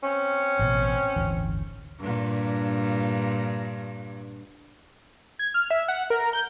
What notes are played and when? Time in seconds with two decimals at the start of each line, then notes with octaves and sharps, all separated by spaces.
0.03 C4 C#4
0.59 A1 B2
1.16 D1 G1 E3
1.99 G2 A#2
5.39 G#6
5.54 F6
5.71 E5
5.88 F#5
6.10 A#4
6.33 G6